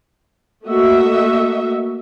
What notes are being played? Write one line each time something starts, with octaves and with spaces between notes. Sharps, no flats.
A3 A#3 F#4 D#5 E5